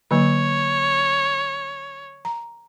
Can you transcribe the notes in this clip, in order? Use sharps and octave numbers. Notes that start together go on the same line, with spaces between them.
D3 F#3 A#3 C#5
A#5